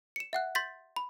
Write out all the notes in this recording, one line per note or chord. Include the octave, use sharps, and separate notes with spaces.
C#7 E7
E5 F#5 F#6
C6 G6 A6 B6
B5